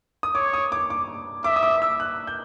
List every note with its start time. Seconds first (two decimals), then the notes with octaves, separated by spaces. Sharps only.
0.23 D#6
0.35 C#5 D6
0.54 D#6
0.72 D6
0.90 D6
1.44 E5 D6
1.56 D#6
1.63 D6
1.82 E6
2.00 F#6
2.27 G6